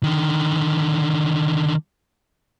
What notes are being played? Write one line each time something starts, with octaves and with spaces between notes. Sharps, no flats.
D3 D#3